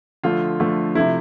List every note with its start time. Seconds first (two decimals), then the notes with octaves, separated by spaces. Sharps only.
0.23 D3 F3 A3 F4
0.60 D3 F3 A3
0.95 C3 F3 A3 E4